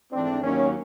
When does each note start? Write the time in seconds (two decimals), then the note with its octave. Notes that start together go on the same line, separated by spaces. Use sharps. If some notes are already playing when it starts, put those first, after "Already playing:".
0.12 G#2 E3 A3 C4 D4
0.43 D#2 D#3 F#3 A#3 C#4